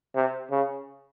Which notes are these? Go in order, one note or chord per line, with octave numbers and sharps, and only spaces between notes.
C3
C#3